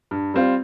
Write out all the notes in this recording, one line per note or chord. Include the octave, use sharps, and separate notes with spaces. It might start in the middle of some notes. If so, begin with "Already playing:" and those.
G2
G3 C4 F4